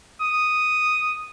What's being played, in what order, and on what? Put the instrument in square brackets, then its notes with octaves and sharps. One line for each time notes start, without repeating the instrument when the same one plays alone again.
[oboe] D#6